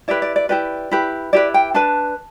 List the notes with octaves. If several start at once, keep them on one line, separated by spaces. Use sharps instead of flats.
E4 G4 B4 D5
D5
D5
E4 G4 B4 D5
E4 G4 B4
E4 G4 B4 D5
G5
D4 B4 A5